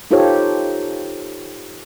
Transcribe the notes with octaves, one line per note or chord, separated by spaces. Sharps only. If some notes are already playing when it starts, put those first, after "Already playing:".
D#4 F4 G4 A4 C5 C#5